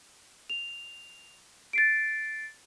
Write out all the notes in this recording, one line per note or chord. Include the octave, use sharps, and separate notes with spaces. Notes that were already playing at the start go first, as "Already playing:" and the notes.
F7
A6 C7 D7